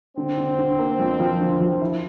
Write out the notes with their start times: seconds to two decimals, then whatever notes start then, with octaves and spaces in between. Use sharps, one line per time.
0.17 D3 C4
0.38 D3
0.59 D3
0.78 A#3
0.99 F2
1.20 F3
1.40 D3
1.61 F3
1.81 E4